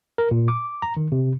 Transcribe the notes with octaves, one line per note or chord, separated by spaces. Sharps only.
A#4
A#2
D6
A#5
D#3
C3